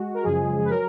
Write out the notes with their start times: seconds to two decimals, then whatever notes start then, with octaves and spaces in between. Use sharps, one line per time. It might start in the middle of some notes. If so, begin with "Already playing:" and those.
Already playing: G#3 F#4
0.14 A#4
0.23 F#2 C#3 F3 G#3 G#4
0.65 B4
0.69 F#3 A#4